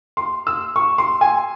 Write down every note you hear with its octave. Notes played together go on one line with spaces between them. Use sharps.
C6
E6
C#6
C6
G#5